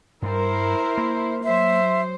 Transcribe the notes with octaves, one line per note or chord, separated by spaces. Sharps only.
G2 G3 E4 A#4 C5
A#3
F#3 C5 E5